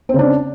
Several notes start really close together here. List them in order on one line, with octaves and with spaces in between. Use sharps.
C4 C#3 D4